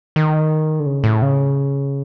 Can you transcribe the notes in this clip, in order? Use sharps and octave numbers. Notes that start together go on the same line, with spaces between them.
D#3
D3
C#3
A2
C#3